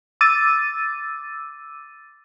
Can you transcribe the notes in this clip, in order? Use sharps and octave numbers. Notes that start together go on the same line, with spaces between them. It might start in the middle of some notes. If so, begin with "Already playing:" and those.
D6 E6 A6 D#7